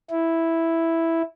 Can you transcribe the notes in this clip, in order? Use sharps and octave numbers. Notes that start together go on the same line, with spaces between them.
E4